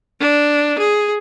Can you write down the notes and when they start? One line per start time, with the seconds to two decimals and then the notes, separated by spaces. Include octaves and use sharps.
0.20 D4
0.78 G#4